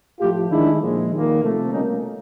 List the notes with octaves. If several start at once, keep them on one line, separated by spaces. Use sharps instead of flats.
A2 F3 A3 F4 G4
D#3 G#3 D4 E4
A#2 F3 G#3
D#3 G3 A#3
C3 F3 A3
B2 G3 A#3 C#4 D#4